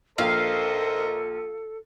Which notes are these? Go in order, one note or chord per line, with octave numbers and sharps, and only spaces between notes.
A#1 A4 A#4 C5 D#5 F5